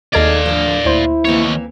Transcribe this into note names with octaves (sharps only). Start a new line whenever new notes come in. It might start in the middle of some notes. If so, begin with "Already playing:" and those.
D#2 D#4 G#4 A4 D5 D#5 F5 G#6
D3 F3
D2 A#2 E4 C5
D#3 E3 A#3 C4 C#5